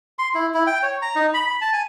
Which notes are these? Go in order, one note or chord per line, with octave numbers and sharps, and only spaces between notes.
C6
E4
E4
G5
C#5
A#5
D#4
B5
B5
A5
G#5